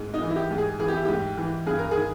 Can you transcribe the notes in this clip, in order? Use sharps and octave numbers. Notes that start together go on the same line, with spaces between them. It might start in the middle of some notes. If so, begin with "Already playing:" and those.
Already playing: G#2
D#4
E3
E4
G4
G#2
G#4
E3 G#4
G4
E4
G#2 G4
E3
G2 G#4
A#4
D#3 G#4